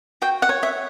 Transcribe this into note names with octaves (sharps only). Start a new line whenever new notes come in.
F#4 G5
F#5
C#5
E5